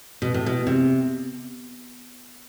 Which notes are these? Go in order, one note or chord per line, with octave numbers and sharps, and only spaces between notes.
B2
A2
B2
C3